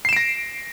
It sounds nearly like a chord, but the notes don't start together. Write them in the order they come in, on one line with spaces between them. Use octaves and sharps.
C7 E7 D7 A#6